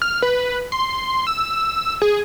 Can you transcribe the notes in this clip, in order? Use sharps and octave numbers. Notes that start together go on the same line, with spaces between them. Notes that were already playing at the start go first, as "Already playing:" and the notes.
F6
B4
C6
E6
G#4